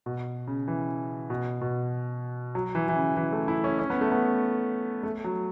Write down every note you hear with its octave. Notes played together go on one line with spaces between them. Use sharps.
B2
C#3
E3
B2
B2
F#3
E3
E3
C#3
E3
A3
E4
C#4
C#4
B3
A3
B3
A3
F#3